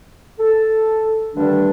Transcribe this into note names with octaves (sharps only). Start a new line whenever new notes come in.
A4
G2 D3 D#3 G3 A3 D4